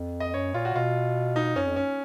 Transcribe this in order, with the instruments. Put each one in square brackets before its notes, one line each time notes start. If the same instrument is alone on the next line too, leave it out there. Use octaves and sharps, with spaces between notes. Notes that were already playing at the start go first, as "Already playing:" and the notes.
Already playing: [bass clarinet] F2
[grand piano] D#5
[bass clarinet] F#2 [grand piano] C#5
[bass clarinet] A#2 [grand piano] F4
[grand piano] F#4
[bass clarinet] B2 [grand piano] F4
[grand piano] D#4
[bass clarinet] F#2 [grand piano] C#4
[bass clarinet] F2
[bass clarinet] F#2 [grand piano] C#4